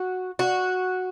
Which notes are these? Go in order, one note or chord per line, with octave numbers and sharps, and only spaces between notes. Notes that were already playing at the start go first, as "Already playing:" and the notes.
Already playing: F#4
F#4